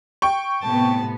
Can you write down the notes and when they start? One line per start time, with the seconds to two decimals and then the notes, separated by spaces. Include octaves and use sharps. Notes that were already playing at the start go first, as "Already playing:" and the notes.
0.22 G5 C#6
0.62 A2 C3 B3 A5